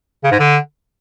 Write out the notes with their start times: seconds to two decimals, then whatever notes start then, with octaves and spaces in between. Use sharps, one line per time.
0.24 C#3
0.32 G#2
0.40 D3